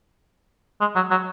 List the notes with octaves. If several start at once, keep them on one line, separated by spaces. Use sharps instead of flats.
G#3
F#3
F#3